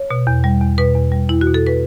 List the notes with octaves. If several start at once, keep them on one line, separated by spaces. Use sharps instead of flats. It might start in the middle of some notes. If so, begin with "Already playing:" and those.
Already playing: C#5
B2
E2
G3
E2
B2 B4
E2
G3
E2 E4
F#4
B2
A4
B4